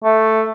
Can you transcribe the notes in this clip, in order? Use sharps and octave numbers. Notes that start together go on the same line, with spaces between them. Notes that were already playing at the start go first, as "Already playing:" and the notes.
A3